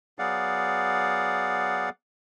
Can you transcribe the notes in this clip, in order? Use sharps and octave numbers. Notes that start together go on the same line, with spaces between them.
F#3 B3 G#4 D5 F5 F#5